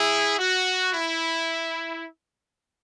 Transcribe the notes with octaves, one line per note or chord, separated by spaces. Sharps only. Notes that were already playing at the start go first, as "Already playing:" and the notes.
Already playing: E4 G#4
F#4
E4